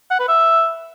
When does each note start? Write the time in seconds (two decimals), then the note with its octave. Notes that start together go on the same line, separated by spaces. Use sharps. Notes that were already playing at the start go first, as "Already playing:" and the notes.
0.11 F#5
0.20 B4
0.28 E5